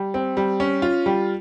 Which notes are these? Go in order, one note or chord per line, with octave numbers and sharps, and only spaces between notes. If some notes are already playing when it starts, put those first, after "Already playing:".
Already playing: G3
C4
G3
C#4
F4
G3